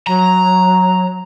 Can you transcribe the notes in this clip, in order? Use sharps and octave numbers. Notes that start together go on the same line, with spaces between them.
F#3 A#5